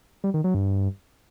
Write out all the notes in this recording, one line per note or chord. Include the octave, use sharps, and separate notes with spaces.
G3
D#3
F#3
G2